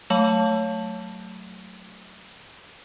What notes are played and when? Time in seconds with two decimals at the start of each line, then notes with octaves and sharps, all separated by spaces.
0.10 F#3 A3 C#5 F5 A5 F#7